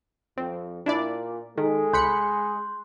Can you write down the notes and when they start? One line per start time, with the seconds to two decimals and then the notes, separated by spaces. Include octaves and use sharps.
0.38 F2 C4
0.86 A#2 D4 E4 D5
1.58 D#3 G#3 A4
1.93 C2 B5 C6 F#6 G6 C#7